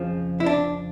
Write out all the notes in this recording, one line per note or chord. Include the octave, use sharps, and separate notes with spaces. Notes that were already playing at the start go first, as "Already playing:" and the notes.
Already playing: F2 C#3 F3
E4
D4